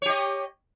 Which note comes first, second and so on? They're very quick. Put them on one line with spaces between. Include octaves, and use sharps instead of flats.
C#5 G4 D#5